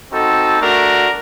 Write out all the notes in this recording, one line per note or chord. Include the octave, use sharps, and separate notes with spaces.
C4 D#4 F#4 A4
A3 D4 F#4 A#4